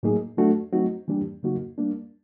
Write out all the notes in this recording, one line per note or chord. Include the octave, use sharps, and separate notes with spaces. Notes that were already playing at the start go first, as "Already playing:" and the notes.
A2 F#3 A#3 D#4 G#4
F#3 A3 D4 F#4 A4
F#3 A3 C4 D#4 F#4
E3 G3 A#3 D4 G4
C#3 F#3 A#3 D#4 F#4
G3 A#3 D4